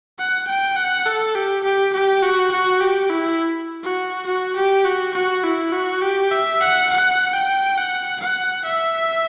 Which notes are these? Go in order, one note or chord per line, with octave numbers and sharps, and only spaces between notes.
F#5
G5
F#5
A4
G4
G4
G4
F#4
F#4
G4
E4
F#4
F#4
G4
F#4
F#4
E4
F#4
G4
E5
F#5
F#5
G5
F#5
F#5
E5